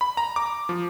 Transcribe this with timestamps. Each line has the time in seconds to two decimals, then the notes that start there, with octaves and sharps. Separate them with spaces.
0.01 B5
0.17 A#5
0.36 D6
0.69 F3